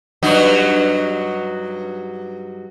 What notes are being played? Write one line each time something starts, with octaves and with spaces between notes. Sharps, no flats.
G2 F#3 D#4